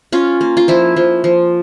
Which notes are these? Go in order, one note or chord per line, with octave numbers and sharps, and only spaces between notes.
C#4 F4
A#3
F4
F3 E4
F3
F3